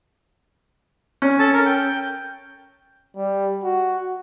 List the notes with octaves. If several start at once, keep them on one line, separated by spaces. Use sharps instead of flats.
C#4
A4 A5
A#4
G5
G3
F#4